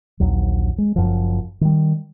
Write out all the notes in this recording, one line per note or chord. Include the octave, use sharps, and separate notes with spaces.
A#1 D#2 F#3
G#3
F#1 F#2 F3
D#3 G3